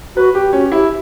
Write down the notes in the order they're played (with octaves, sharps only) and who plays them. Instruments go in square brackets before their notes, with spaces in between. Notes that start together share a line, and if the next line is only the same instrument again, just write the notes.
[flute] F#4 [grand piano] B4
[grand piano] G4
[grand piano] C#4 [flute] F#4
[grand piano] E4 [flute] G4